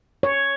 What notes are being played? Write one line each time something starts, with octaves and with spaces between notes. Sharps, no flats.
C#5